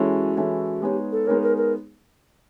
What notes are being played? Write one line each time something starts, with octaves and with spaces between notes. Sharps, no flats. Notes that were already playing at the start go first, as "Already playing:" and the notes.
Already playing: E3 G#3 C#4 E4 F#4 A4
E3 G#3 C#4 E4 A4
G#3 B3 D#4 G4 G#4 C#5
A4
G#3 B3 D#4 G#4 A#4 C#5
A#4
A#4